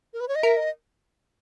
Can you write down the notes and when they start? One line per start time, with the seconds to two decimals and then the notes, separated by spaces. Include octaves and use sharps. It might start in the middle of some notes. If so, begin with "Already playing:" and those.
0.13 A#4
0.20 B4
0.28 C#5
0.35 D#5
0.43 A#4 E5
0.57 D#5